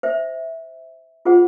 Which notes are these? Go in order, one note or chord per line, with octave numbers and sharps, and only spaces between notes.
C5 E5
F4 G#4 C5 F#5